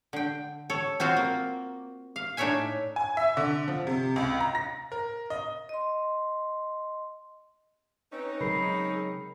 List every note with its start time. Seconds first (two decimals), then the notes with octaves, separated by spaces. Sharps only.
0.13 D3 G5
0.70 A4 C#5
1.00 C4 F4 F#4 C5
1.17 A#3
2.16 F5
2.37 A2 D4 D#4 C#5 E5 G#5
2.96 G#5
3.17 E5
3.37 D3
3.68 F3
3.87 C3
4.16 C#2
4.40 A#5
4.55 A#6
4.92 A#4
5.30 D#5
5.69 D#5 C6
8.12 C4 C#4 D#4 B4
8.40 C#3 F#3 G#3 G#4 A#4 B5 C7